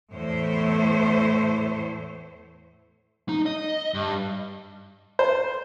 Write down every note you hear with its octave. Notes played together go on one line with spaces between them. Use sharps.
E2 A2 A3 E4 C5 C#5
D#4
D#5
G2
C5